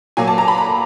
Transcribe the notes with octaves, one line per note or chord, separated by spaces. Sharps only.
A#2 F#3 A#3 G#5
A5
A#5
B5
A#5